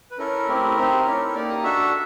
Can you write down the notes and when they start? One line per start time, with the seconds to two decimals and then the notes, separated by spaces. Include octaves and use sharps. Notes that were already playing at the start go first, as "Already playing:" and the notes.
0.11 B4
0.18 C#4 E4 A4 A#4
0.48 A3 C4 E4 G4
0.76 C4 D#4 G4
1.05 C#4 E4 A4
1.34 A#3 D#4 G4 D5
1.49 D#5
1.63 D4 F#4 A4 E5